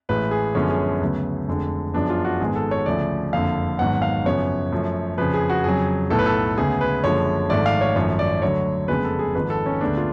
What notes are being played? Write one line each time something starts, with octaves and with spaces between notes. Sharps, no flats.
A1 A2 G#3 B4
G#4
F#2 D3 F3 G#3 B3 C#4
G#4
D2 C#3 F#3 B3
F1 F2 D3 G#3
F#2 F3 G#3 B3 D4
F4
F#4
G#1 G#2 G#3 B3 G#4
A4
C#5
D2 C#3 F3 A3 D5
F#1 F2 D3 F5
G#1 G#2 F#3 B3 F#5
F5
F#2 C#3 F3 B3 C#5
F#2 F3 A3
F2 C#3 F3 B4
G#4
F#4
F2 C#3 F#3 G#4
B1 A2 F#3 B3 A4
B4
A4
D2 C#3 G#3 B3 G#4
B4
F#1 F#2 D3 F3 G#3 C#5
G#1 G#2 F3 A3 D5
F5
C#5
G#1 F#2 F3 A3 C#5
D5
D2 D3 F#3 C#5
F#1 F2 C#3 G#3 B3 B4
A4
G#4
G#1 G#2 F3 B4
A4
C#4
D2 D3 G#3 B3 D4
F4